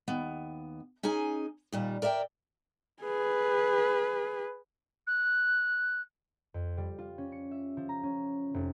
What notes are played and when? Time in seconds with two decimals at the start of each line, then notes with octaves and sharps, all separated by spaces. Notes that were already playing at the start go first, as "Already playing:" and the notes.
0.08 D#2 B3
1.03 C#4 D#4 G#4 G#5
1.72 D#2 A#2 G3
2.02 A#4 D5 E5 F5 G5
3.03 G#4 B4
5.07 F#6
6.54 F2
6.77 G3
6.98 F4
7.18 C#4
7.32 C#7
7.51 E5
7.77 F3
7.89 A#5
8.03 C#4
8.54 F1